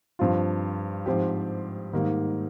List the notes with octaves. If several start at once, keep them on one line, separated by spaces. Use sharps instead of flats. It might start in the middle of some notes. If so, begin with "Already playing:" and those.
G2 F3 C4 F4
G#2 F3 C4 G4
G#2 D#3 G3 A#3 D#4